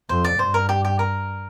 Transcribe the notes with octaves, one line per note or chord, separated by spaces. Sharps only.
F2 C5
D5
G2 C5
A#4
G4
G4
A#4